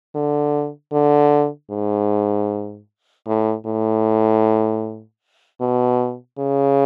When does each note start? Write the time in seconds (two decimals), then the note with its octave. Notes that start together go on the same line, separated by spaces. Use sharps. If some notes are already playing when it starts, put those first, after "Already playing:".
0.15 D3
0.93 D3
1.71 G#2
3.27 A2
3.66 A2
5.61 B2
6.39 C#3